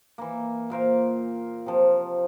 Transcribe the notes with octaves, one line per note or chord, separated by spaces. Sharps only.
E3 A#3
A#2 A#4 C5 F5
C3 F3